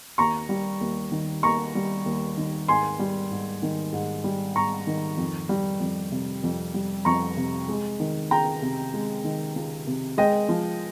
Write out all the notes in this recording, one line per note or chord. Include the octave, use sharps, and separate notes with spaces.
D#2 A#5 C#6
G3
D#2
D#3
D#2 A#5 C#6
G3
D#2
D#3
G#2 G#5 C6
G3
G#2
D#3
G#2
G3
G#2 A#5 C#6
D#3
F2
G3
F2
C3
F2
G3
F2 A#5 C#6
C3
G#3
D#3
C#2 G5 A#5
C3
G#3
D#3
C#2
C3
G#3 D#5 G5
F3